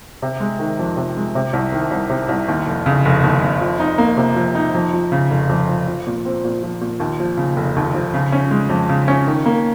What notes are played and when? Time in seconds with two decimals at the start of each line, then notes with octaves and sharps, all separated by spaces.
0.22 C3
0.40 G#3
0.59 D#3
0.79 F2
0.97 C3
1.17 G#3
1.35 C3
1.53 C2
1.72 D#3
1.91 C2
2.10 C3
2.29 C2
2.48 D#2
2.67 F1
2.86 C#3
3.05 F1
3.24 D#2
3.42 F1
3.61 F3
3.80 D#4
3.98 A#3
4.17 C3
4.36 F3
4.55 D#4
4.74 F2
4.94 F3
5.12 C#3
5.30 F1
5.49 F2
5.69 F3
5.88 F3
6.07 A#2
6.25 C4
6.44 A#2
6.63 F3
6.81 A#2
7.00 D#2
7.20 F3
7.37 C#3
7.56 F1
7.76 D#2
7.94 F3
8.14 C#3
8.32 C#4
8.51 G#3
8.69 F2
8.89 C#3
9.08 C#4
9.27 D#3
9.46 A#3